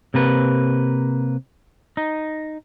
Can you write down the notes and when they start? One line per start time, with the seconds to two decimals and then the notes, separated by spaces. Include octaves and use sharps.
0.14 C3 A#3 B4
1.97 D#4